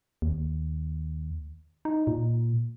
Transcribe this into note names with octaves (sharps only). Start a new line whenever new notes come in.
D#2
D#4
A#2